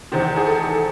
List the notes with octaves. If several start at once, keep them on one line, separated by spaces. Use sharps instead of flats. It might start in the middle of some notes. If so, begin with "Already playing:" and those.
E2 C3 D#3 C5
G#4
A4